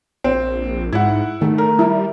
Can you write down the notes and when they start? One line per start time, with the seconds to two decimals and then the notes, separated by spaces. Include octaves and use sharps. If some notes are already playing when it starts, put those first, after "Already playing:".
0.24 A#1 C4
0.93 G#2 E4 F#5
1.41 D#3 A3
1.58 A#4
1.79 G3 E4